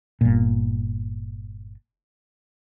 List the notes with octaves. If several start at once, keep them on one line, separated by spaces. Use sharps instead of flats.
G1 A#2